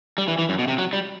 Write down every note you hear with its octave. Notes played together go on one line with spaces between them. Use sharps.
G3
E3
E3
F#2
B2
C3
F#3
G3